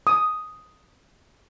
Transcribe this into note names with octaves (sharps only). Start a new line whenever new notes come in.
D#6